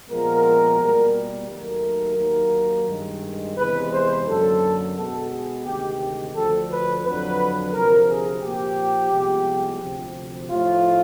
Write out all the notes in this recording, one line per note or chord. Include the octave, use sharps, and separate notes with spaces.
A#2 F3 G#3 B3 A#4
B2 G3 A#3
D#2 D#3 F#3 A3 A#4
D#2 D#3 F#3 A#3
G2 D#3 G#3
E2 C3 E3 G#3 B4
C5
F#2 D3 F#3 A#3 A4
B2 G#3 B3 A4
G#4
D2 C3 D#3 G#3 G4
G4
D2 D3 F3 A4
B4
F2 D3 F#3 B4
D2 C3 F3 A#4
G#4
A#2 F3 A#3 G4
C2 C3 F3 G#3 B3
D2 C3 F3
A2 F3 A3 F4